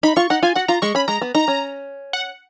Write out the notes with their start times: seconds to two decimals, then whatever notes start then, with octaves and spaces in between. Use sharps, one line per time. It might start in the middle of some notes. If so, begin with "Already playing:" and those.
0.03 D#4 B5
0.16 F4 C#6
0.30 D#4 F#5
0.43 F4 G#5
0.55 F#4 F#5
0.68 F4 A#5
0.82 G#3 C#6
0.95 C#4 B5
1.08 G#3 A#5
1.21 B3
1.35 D#4 A#5
1.48 C#4
2.13 F#5